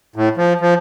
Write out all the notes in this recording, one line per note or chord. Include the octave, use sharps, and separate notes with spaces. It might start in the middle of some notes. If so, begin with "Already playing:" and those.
A2
F3
F3